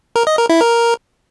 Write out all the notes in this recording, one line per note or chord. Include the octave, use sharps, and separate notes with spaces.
A#4
D#5
A#4
E4
A#4